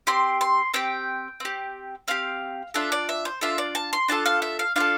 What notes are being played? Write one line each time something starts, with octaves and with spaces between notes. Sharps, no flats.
C4 G4 C6
C6
C4 G4 G5
C4 G4
C4 G4 F5
D4 F4 A4 E5
D5
E5
C5
D4 F4 A4 E5
D5
A5
C6
D4 F4 A4 A5
F5
E5
F5
D4 F4 A4 F5